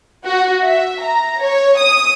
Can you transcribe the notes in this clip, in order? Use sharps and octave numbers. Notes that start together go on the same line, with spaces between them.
F#4
E5
A#5
C#5
D#6